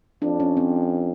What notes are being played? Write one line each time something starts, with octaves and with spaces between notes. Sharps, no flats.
F2 D4
C#4
C4